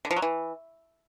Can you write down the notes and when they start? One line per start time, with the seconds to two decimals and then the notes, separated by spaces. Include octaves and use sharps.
0.05 D3
0.11 F3
0.16 F#3
0.22 E3